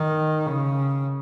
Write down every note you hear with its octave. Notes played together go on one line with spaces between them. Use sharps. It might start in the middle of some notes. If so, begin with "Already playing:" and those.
Already playing: D#3
C#3